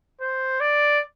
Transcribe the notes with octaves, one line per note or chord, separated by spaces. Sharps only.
C5
D5